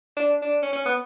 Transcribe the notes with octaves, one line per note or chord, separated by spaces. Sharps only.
D4
D4
C#4
C#4
B3